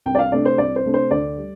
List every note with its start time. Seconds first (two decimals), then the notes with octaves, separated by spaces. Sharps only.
0.06 C2 G5
0.15 D5
0.19 F5
0.32 C3 A3 D4 D5
0.45 C5
0.58 C2 D5
0.76 C5
0.85 C3 A3 D4
0.94 C5
1.11 D2 D5
1.37 G3